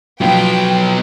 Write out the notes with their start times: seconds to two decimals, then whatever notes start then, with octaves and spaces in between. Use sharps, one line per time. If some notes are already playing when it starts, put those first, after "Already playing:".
0.21 B2 F3 F#3 B3 G5